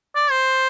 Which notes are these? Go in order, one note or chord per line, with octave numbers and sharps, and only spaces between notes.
D5
C5